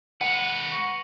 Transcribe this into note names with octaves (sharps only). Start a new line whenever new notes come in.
G#3 B4 F#5 C#7 F7 F#7
C#6 A#6 C#7